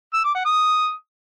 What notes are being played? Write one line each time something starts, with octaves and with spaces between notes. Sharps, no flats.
E6
D6
F#5
D#6